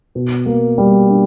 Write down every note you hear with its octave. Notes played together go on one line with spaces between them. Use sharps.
B2
A#3
G3
D4